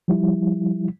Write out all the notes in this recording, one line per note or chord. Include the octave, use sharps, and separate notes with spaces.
F3 G3 E4